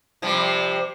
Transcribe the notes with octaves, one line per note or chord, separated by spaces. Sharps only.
C3 F3 G3